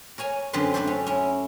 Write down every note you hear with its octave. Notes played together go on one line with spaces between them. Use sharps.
A#4 C#5 G#5 A#5
F#2 D3 F#3 C4 B4 C6
A3 D4 E4 F#4 A4 C5
C#4
C#4 E4